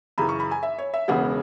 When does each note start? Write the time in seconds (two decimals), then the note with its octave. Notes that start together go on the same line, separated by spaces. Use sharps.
0.18 F#2 C#3 E3 B5
0.29 C#6
0.40 B5
0.51 G#5
0.63 E5
0.78 C#5
0.94 E5
1.08 E1 E2 C#3 G#3 B3 F#5